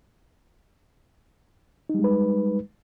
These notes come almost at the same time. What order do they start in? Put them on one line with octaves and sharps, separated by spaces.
D#4 G3 G#3 B4